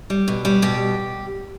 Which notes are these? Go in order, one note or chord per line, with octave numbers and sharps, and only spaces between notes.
G3
B2
G3
B2 G4